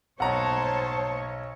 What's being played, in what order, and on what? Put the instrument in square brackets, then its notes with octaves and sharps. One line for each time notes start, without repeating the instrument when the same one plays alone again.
[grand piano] B1 [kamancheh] C5 A5 [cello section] C#5 [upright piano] F#5 A#5